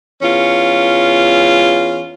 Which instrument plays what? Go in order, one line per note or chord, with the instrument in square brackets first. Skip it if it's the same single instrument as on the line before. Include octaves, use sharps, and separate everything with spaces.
[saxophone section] E2 C#4 F4